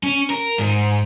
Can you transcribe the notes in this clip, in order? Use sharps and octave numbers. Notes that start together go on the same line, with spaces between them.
C#4
A#4
G#2